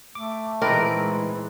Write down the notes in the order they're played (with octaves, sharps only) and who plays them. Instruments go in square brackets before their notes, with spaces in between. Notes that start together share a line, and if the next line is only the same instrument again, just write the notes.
[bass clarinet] A3 [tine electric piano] D6
[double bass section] A#2 E3 G#3 [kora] C4 A#4 D5 [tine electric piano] D#4 B4